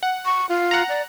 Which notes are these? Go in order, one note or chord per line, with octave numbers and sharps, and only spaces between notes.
F#5
C#6
F4
F#5 A#5
D5